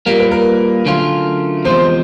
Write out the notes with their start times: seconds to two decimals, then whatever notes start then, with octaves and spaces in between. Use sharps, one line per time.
0.06 A#2 G3 A#3 A#4
0.20 B4
0.31 A#4
0.85 D3 F#3 A3 C#4 F4
1.65 E2 C3 F3 G#3 C5
1.85 C5